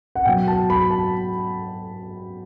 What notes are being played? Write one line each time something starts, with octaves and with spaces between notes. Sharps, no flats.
F#5
B2 F#3 G5
A5
B5
A5